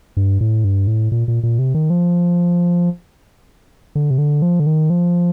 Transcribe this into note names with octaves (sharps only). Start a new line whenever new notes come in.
G2
A2
G2
A2
A#2
A#2
A#2
C3
D#3
F3
D3
C3
D3
F3
D3
D#3
F3